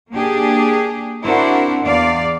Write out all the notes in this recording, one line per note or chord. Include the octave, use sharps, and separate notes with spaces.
A#3 D4 G4 G#4
C4 D4 E4 F#4 A#4 C5
E2 D5 F5